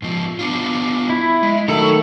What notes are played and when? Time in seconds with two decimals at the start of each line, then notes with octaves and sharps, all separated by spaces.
0.02 G#2 F3
0.39 B3 D4 F4
1.09 E4
1.43 G#3
1.68 D#3 F#3 A3 A4 A#5